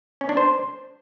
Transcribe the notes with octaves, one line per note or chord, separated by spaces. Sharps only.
C#4
D4
C5